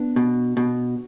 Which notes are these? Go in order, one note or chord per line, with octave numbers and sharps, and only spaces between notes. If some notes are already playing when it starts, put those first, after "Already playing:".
Already playing: B3 D4
B2
B2